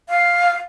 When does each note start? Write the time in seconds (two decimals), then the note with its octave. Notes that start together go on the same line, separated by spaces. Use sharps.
0.09 F5